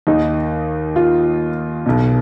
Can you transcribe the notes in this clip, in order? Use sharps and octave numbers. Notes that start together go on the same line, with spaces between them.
D#2 D#3 D#4
F4
B1 B2